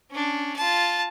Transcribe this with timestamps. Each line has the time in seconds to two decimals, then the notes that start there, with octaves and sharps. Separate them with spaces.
0.10 C#4 D4
0.56 F4 A5